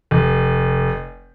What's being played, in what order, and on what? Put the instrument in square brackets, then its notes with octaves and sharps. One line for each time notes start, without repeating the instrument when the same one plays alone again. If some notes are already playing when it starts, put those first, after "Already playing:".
[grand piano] F1